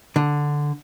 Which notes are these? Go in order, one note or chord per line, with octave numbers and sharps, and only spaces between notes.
D3